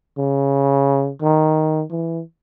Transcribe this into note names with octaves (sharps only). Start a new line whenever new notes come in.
C#3
D#3
E3